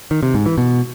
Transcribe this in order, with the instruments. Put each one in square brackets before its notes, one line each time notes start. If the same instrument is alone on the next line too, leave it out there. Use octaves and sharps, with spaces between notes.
[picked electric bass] D#3
C3
G#2
E3
B2